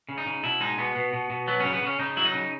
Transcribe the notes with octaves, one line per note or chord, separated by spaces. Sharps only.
C#3
D#4
C#3
B2 E4
G#3 D#4
B2 B3
B2
B2
B2
F#3 B3
C#3 C#4
B3
C#3 C#4
C#3 D#4
F#3 E4
D#4
C#3